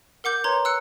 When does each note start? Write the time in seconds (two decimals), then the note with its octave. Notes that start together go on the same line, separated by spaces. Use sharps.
0.24 A#4 F#5 D6 G6
0.44 B4 C#5 A#5 C6 G#6
0.65 E6 F#6 C#7